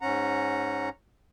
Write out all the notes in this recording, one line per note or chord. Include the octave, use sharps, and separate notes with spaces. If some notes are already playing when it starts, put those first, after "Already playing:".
G#2 C#4 F#5 A#5